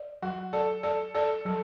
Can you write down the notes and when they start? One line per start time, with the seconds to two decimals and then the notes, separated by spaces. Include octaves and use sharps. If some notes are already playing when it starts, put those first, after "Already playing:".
Already playing: D5
0.22 F#3 F#4
0.53 A4 D5
0.83 A4 D5
1.14 A4 D5
1.45 F#3 A4